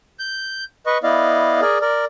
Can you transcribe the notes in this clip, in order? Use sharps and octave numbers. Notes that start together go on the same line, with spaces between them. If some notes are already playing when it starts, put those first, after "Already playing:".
G6
B4 D#5 C#6
B3 E4 D5 D#5 F5
G#4 A#4 D5
A#4 D5